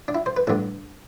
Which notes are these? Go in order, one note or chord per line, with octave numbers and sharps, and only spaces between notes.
D4
E4
C5
B4
A1 G2 D3 A4